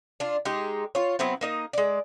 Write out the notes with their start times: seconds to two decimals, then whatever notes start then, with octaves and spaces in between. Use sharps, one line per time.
0.20 D4 F4
0.45 G#3 D#4 G4
0.95 F4 C#5
1.19 F#3 B3 C4 E4
1.41 A#3 D#4 D#5
1.73 G#3 D5